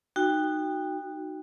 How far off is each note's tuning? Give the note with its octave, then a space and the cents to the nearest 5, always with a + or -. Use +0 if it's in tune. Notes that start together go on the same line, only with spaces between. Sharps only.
D#4 -20 F#4 +0 G5 +20